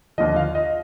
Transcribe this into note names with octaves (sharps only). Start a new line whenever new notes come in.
D#2 D3 F3 D#5
F5
D#5